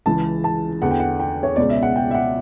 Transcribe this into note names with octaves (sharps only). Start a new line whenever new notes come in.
C#2 C#3 E3 A5
A5
E2 D3 F#5
G5
F#5
G5
C#5
C#2 B2 D5
E5
F#5
G5
E5
F#5